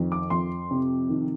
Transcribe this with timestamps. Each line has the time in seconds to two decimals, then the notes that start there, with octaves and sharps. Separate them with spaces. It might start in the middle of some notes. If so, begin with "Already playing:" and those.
Already playing: F2 D#3
0.12 D6
0.30 F2 C6
0.71 C3
1.09 D#3